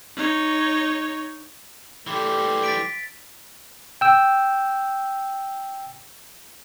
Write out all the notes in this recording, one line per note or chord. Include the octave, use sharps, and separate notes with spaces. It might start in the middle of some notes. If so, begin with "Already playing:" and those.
D#4 C#5
E3 G3 A3 G4 C6
A6 B6 D7
G5 E6